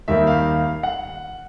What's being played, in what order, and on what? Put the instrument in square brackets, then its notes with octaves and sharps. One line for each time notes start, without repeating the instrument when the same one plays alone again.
[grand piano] D#2 D#3 G3 A#3 E5
F5
F#5